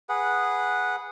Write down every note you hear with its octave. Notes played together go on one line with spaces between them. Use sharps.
G#4 B4 F#5